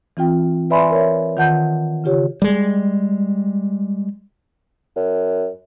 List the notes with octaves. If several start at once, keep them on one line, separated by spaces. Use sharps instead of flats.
E3 C4 F4 G5
B4 D5 E5 G#5 B5 C6
A#4 C#5 E5
D#3 F4 F#5 A5 G6
C#3 F4 G4 C#5
G3 G#3
F#2